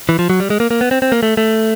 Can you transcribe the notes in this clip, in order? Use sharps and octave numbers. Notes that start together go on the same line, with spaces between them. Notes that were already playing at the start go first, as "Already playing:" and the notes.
E3
F3
F#3
G3
G#3
A#3
A#3
B3
C4
C4
A#3
A3
A3